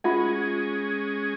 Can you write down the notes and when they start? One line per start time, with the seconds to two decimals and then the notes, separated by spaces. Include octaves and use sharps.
0.04 G#3 C#4 F4 G#4 E5 F#5